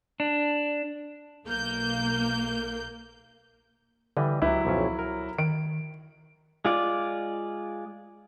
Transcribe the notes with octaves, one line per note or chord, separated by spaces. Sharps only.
D4
B1 A#3 G6
D3 E3 G3 D#5
C#2 F#3 E4 G4 B4
B1 F2 C#4
A#4
D#3 D7
G#3 F4 D5